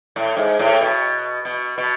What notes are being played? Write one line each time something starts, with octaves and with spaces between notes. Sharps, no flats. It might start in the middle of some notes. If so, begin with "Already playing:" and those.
A2
G#2
A2
B2
B2
B2